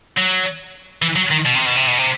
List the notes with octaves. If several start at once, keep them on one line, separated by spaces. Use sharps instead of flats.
F#3
E3
F#3
D#3
B2
C3
B2
C3
B2
C3